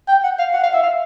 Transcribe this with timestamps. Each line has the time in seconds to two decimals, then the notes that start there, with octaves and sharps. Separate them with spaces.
0.08 G5
0.24 F#5
0.39 F5
0.53 F#5
0.63 F5
0.74 E5
0.83 F5